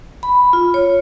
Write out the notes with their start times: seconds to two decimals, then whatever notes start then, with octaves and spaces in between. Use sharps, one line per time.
0.23 B5
0.53 F4
0.74 C#5